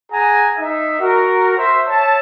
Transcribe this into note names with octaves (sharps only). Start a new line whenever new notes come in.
G#4 F#5 G#5 A#5
D#4 E5
F#4 A#4
C5 E5
C#5 E5 A5